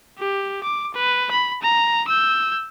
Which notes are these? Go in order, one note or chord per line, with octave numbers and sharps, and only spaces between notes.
G4
D6
B4
B5
A#5
E6 G6